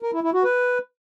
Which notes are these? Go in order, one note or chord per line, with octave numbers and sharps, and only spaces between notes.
A#4
E4
E4
F#4
B4